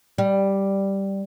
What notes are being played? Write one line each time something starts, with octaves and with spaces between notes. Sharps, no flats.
G3